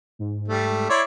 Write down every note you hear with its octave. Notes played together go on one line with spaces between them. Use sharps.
G#2
G3 A3
E4 C#5 D5 C6